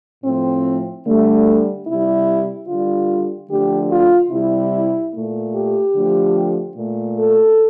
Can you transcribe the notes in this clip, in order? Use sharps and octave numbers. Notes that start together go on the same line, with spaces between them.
A2 F3 A3 C4
D3 G3 A3
C3 G3 E4
D3 G3 F4
D3 F3 A3 G4
F4
C3 G3 E4
A#2 A3
G4
D3 F3 A3
A#2 A3
A4